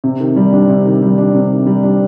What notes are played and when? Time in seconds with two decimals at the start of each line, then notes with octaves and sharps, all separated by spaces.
0.04 C3
0.20 D#3
0.36 G3
0.53 D4
0.69 C3
0.85 D#3
1.02 G3
1.18 D4
1.34 C3
1.51 D#3
1.66 G3
1.83 D4